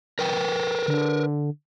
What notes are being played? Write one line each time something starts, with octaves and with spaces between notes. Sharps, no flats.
A#4 B4 G5
D3